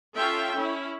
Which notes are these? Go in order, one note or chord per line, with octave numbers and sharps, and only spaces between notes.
C#4 F4 A4 E5 G5
C#4 E4